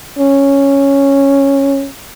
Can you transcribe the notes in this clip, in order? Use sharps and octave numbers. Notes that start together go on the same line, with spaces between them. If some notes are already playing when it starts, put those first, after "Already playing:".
C#4